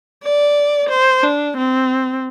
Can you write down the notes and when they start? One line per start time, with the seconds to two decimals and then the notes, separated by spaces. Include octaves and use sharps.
0.24 D5
0.90 C5
1.23 D4
1.57 C4